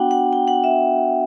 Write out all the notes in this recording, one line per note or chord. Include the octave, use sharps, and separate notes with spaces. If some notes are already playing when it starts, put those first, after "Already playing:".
Already playing: B3 D4 F#4 F#5 G5
F#5
G5
F#5
E5